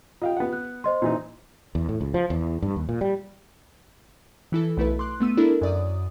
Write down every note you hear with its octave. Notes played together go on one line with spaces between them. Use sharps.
F4 D#5 F5 G5
B3 F#5
F#6
C5 D#5 C6
A#2 E3 D#4
E2
A2
C#2
F3
E2
G2
D#2
A#2
G3
E3 E4 A4
B1 A3 E4 B4
C6 D6 F#6
A3 B3 E6 D#7
D4 E4 A4 A#4
F#2 D5 D#6